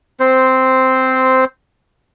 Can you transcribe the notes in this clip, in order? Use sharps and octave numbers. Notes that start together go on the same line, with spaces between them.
C4 C5